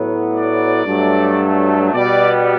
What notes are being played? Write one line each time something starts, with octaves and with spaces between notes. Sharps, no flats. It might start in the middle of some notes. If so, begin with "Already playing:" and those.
Already playing: A2 F#3 B3
D5
G2 F#3 A3
B2 G3 B3 D5